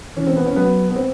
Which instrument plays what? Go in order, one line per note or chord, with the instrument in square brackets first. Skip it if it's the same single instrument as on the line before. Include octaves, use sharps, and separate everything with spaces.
[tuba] E3 [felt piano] C#4
[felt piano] C4
B3
C#4
[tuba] F#3 [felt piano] B3
[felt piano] B3
C4